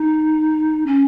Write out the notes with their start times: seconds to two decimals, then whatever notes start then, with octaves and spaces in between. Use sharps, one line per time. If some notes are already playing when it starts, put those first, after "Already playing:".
Already playing: D#4
0.86 C#4